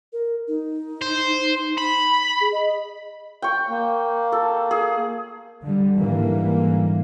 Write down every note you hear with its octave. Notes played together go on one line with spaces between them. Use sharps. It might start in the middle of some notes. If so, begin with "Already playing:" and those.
A#4
D#4
C5
B5
G#4
D#5
G5 C#6
A#3
A4
G#4
D3 G3
G#2 D3 E3 G3 A#3